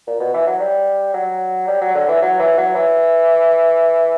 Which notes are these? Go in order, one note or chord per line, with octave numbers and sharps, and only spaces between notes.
A#2
B2
E3
F#3
G3
F#3
G3
F#3
D3
E3
F#3
E3
F#3
E3